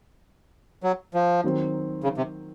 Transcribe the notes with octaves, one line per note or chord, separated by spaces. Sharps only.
F#3
F3
D#3 F#3 C4
C#3
C3